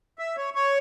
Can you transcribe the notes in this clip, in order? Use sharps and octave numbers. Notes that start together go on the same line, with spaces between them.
E5
C#5
C#5